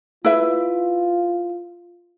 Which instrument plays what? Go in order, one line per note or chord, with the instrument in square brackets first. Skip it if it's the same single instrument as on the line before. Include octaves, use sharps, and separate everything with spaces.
[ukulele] E4 B4 E5 [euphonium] F4